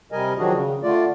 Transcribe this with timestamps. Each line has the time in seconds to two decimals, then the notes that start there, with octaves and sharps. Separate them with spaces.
0.12 C3 G3 A#4 D#5 G#5
0.38 D#3 F3 F#3 D4 F#4 G#4
0.53 C#3
0.83 D3 A3 F4 D5